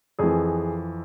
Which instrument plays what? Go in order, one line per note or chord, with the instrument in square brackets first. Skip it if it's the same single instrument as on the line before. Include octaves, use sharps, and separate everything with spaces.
[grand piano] F2 E3 G#4